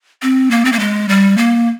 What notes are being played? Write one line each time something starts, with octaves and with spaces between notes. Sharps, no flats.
C4
A#3
C4
A#3
G#3
G3
A#3